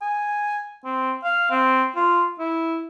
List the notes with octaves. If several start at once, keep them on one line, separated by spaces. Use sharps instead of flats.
G#5
C4
F5
C4
F4
E4